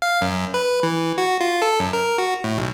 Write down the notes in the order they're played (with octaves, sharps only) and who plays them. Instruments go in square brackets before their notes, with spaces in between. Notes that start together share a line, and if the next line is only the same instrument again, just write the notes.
[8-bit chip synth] F5
F#2
B4
E3
F#4
F4
A4
F#2
A#4
F#4
A2
B1